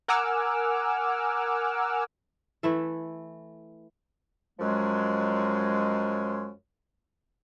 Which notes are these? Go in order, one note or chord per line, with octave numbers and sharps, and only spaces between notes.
A#4 F#5 G#5 D6 E6 F6
E3 A3 E4 A4
F#2 F3 F#3 G#3